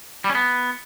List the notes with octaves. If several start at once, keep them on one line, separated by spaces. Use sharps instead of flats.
G3
C#4
B3